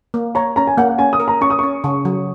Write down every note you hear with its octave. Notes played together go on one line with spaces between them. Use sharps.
A#3
C#5 A#5
C#4 A#5
G#5
A#3 F#5
F#5
C#4 G#5
D#6
A#4
A#5
C#4 C#6
D#6
C#4 C#6
C#3
F#3